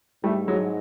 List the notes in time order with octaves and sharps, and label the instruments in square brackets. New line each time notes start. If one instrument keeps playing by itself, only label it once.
[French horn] G#2 [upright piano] G3 A3
[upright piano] F#3 G#3